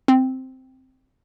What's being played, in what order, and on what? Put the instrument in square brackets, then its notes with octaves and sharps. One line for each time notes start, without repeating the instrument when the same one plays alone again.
[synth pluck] C4